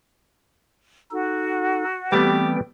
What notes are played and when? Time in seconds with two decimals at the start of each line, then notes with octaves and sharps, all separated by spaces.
1.11 D#4 F#4 A4
2.12 E3 G3 A3 B3 C4 G4 G5